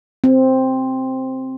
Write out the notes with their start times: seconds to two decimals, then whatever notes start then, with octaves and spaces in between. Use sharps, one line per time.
0.24 C4